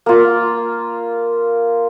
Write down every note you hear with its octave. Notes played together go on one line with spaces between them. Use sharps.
A#3 F4